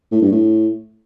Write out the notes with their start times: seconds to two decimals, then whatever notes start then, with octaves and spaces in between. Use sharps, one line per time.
0.11 A2
0.22 G2
0.32 A2